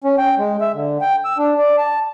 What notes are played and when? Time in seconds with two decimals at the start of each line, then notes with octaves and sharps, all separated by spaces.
0.04 C#4
0.18 G5
0.38 G#3
0.61 E5
0.74 D3
1.01 G5
1.25 E6
1.38 D4
1.58 D5
1.78 A5